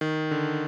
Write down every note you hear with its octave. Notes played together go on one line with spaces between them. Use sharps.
D#3
D3